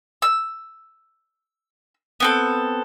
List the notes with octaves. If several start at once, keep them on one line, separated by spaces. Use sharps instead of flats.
E6
B3 C4 A4